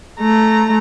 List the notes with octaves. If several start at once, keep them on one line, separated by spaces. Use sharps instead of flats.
A3 A#5